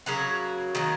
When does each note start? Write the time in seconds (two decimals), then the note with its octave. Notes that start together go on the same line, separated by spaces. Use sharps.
0.06 C#3 F#3 A#3 F#4 A#4
0.75 D#3 F#3 A#3